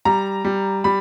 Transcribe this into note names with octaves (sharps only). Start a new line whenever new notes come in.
G3 A#5
G3
G3 B5